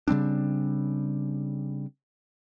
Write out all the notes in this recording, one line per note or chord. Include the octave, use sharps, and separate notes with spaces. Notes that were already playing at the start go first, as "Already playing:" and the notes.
C#3 G3 C4 D4